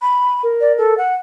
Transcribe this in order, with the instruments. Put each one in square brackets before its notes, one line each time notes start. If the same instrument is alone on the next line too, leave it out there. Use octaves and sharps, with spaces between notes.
[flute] B5
[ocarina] A#4
[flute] D5
A4
F#5